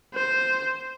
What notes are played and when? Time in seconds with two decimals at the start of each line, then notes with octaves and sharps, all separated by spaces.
0.14 C5